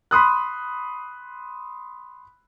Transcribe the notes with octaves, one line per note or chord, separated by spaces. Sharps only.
B5 C6 D#6 F#6